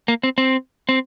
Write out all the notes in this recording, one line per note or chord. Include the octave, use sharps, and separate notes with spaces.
A#3
C4
C4
C4